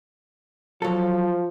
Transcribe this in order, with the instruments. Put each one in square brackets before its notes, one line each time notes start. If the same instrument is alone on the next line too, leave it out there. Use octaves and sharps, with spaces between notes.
[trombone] F3 [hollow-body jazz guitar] F#3 A4